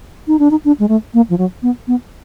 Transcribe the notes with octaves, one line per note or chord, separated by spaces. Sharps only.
D#4
D4
D#4
D4
G#3
A3
A#3
F3
F#3
B3
B3